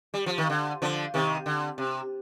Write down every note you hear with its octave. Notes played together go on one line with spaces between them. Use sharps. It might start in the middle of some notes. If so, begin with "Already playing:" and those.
G3
F3
D#3
D3
D3 F3
C3 D#3
D3
C3